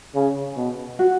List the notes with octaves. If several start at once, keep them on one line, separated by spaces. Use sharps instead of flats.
C#3
B2
F#4